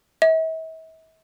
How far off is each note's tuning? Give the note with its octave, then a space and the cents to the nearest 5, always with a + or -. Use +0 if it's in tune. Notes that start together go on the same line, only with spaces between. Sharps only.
E5 -40